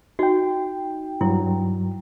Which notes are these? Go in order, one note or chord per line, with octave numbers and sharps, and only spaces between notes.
D#4 F#4 G5
G2 F#3 E4